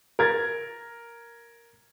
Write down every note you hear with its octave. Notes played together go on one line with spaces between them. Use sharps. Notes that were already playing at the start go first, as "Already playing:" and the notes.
A#4 G#6 A6